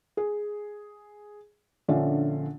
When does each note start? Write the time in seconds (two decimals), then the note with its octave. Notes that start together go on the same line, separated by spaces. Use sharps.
0.17 G#4
1.88 A#1 D3 C#4 F4 D5 E5